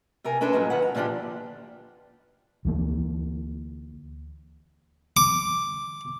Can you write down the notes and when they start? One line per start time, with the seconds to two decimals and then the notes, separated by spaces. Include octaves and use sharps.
0.24 C3 G4 A#4 G#5
0.41 C#4 D4 A4 B4 C5
0.53 G2 A#2 F#3 G#3
0.70 D#3 B4 F#5
0.82 A#5
0.95 A#2 D3 F3 D4 G4
2.65 D2 E3 A#3
5.17 D6